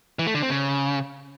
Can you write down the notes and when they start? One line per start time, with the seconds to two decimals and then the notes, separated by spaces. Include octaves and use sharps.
0.19 E3
0.27 A3
0.34 D3
0.42 C4
0.50 C#3